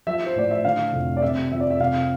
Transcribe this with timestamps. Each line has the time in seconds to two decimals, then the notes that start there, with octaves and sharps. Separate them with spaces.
0.07 F3 E5
0.26 C5
0.35 A2 D5
0.51 E5
0.65 D3 F5
0.93 F1
1.17 D5
1.22 C3 E5
1.52 F2 E5
1.61 D5
1.70 E5
1.79 C3 F5